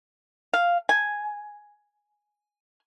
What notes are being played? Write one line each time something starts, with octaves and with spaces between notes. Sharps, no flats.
F5
G#5